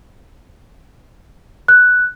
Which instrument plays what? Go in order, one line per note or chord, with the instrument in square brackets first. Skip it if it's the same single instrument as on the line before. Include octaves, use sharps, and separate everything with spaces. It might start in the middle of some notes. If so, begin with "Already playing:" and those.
[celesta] F#6